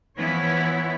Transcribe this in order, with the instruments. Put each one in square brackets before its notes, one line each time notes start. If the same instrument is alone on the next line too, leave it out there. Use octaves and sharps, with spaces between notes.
[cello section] E3 F3 B3 E4 C#5